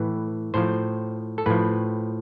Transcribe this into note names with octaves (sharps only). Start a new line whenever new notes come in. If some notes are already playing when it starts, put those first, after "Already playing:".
Already playing: A2 E3 B4
A2 F3 C5
A4
A2 F3 B4